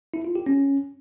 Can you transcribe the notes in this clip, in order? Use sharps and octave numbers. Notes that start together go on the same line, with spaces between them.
E4
F4
G4
C#4